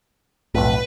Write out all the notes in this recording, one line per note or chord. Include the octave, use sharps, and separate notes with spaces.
B1 F2 A2 B4